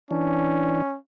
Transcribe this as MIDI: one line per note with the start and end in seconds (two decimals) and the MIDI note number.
0.11 0.82 52
0.11 0.96 61
0.11 0.82 62